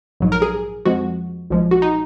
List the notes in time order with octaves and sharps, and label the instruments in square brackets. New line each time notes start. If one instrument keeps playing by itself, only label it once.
[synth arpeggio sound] A#1 G#2 F#3
A#4
G#4
F2 F3 G#3 F#4
B1 A#2 F3 G#3
F#4
D#4